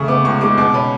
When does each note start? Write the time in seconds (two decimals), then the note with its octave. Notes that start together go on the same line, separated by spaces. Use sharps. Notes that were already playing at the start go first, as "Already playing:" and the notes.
Already playing: C#3 A3 C#6
0.08 B3 D6
0.25 C#2 C#6
0.41 G#3 D6
0.58 B2 D6
0.74 C#4 B5